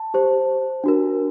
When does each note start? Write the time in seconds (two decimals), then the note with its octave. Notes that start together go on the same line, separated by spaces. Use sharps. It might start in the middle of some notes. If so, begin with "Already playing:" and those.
Already playing: A5
0.14 G4 C5
0.84 D4 F#4 A#4